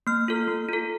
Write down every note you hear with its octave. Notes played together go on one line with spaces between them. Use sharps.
A#3 F6
F4 A4
A#3
F4 A4